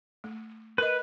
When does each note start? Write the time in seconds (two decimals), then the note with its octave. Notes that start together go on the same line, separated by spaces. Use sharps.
0.24 A3
0.78 A#4 B4 D#5